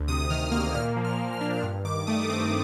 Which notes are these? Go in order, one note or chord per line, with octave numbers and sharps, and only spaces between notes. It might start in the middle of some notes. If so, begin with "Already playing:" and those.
Already playing: D2
C3 D#6
D#3 F6
D#6
A#3 F6
A#2 F6
F3
F6
A#3
F6
D4
G2
D#3 D6
A3 D#6
D#6
C4 D6